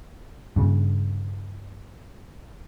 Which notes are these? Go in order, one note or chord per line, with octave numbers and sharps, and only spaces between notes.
G2 C#3